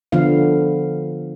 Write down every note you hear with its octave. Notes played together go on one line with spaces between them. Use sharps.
D3 F3 B3 F5